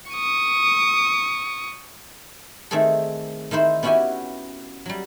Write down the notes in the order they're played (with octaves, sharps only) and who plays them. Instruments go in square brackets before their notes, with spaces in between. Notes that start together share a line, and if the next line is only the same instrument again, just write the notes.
[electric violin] C#6 D#6
[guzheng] D#3 A3 C4 G#4 A4
D#3 D#4 E4 C5
B3 C#4 E4 F#4 G4 G#5
F#3 G3